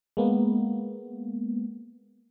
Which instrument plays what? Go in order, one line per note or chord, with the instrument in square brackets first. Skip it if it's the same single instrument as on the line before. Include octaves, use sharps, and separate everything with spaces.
[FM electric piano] G#3 A#3 B3